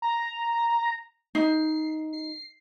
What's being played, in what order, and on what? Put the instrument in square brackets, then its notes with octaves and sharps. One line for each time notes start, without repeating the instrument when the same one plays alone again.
[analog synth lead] A#5
[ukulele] D#4 [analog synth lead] C7
[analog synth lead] C7